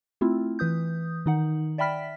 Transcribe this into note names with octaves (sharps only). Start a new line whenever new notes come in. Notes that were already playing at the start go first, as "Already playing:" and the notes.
A3 C4 E4 F4
E3 B4 D#6 G6
D#3 D#4 F#5
D5 E5 G5 B5 F6 B6